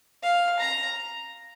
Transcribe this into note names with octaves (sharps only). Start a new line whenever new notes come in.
F5
A#5